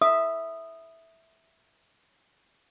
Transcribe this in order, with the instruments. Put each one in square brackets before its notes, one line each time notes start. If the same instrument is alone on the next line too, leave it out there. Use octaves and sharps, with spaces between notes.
[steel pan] E5 [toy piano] D#6